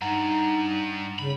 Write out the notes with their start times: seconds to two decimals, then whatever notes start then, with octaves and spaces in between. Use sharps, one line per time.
0.02 G2 D#4 F#5 A#5
1.19 C#3 B5